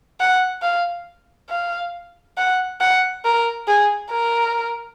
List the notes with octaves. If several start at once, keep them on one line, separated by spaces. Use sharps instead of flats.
F#5
F5
F5
F#5
F#5
A#4
G#4
A#4